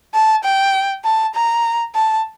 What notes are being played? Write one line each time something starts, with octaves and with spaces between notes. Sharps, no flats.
A5
G5
A5
A#5
A5